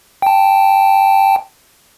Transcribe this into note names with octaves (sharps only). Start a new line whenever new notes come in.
G5 A5